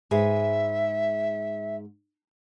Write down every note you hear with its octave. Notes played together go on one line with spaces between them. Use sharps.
G#2 G#4 B4 E5